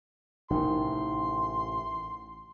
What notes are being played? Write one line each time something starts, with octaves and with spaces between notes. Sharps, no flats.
A1 C3 D#3 C6